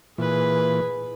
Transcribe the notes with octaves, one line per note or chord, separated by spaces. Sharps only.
A#2 E3 G#4 B4